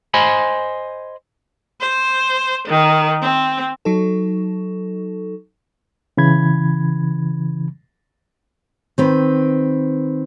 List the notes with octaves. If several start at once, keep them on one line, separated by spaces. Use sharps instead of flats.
C5 D#5 G#5 B5
C5
D#3
C4
F#3 D#4 A4
C#3 E3 B5 G#6
D#3 C4 B4